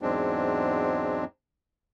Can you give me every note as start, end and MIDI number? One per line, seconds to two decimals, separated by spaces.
0.02 1.25 40
0.02 1.25 44
0.02 1.25 54
0.02 1.25 56
0.02 1.25 60
0.02 1.25 62